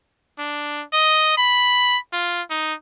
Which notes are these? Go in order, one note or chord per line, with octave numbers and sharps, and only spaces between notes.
D4
D#5
B5
F4
D#4